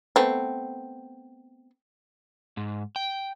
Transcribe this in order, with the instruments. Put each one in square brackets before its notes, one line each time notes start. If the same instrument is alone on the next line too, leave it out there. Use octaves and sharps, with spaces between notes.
[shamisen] A3 B3 C4
[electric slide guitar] G#2
G5